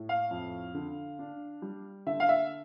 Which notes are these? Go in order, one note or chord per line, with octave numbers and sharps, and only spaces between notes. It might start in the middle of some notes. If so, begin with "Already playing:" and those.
Already playing: A2
F5
F2
D3
D4
G3
D3 E5
F5
E5